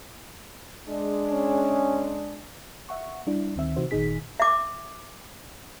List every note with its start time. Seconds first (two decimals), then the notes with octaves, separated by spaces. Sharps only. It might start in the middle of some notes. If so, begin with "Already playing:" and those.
0.87 G#3 D4
1.31 C#4
2.89 E5 F#5 C#6
3.27 G3 D4 E4
3.56 D2 D#3 C4 E5 E6
3.76 C3 E3 D#4 F#4 C5
3.91 G1 A#2 D#3 D#4 G#4 B6
4.40 E5 D6